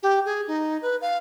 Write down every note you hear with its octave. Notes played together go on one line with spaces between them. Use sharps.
G4
G#4
D#4
B4
F5